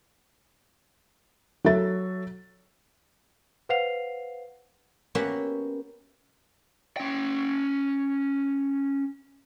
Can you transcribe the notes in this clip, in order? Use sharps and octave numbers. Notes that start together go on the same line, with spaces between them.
F#3 F#4 A4 E5 A6
B4 C5 F5 F#5 C7 F7
A#3 B3 C#4 F#4 G4 E5
C#4 G5